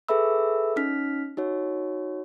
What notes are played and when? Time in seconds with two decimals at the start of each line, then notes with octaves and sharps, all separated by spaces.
0.09 G#4 A4 B4 E5 B5 E6
0.76 C#4 D#4 F6 B6
1.37 D#4 F#4 C#5